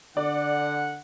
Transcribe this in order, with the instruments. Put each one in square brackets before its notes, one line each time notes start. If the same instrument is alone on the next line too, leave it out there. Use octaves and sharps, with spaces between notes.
[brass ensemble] D3 F#5 [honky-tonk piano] D5